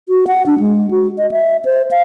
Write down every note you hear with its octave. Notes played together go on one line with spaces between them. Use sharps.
F#4
F#5
D4
G#3
F#4
D#5
E5
C5
F5